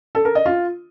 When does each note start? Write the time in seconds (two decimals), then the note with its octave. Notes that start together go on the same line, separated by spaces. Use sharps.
0.15 A4
0.25 A#4
0.35 D#5
0.46 F4